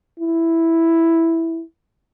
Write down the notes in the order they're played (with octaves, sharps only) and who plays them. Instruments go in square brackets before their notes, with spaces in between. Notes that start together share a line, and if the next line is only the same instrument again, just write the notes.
[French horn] E4